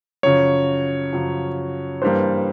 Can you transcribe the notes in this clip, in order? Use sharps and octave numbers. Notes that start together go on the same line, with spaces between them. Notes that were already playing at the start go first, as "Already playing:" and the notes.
F#2 C#3 F3 C#5
F#2 C#3 F3
G2 E3 G3 A#3 C5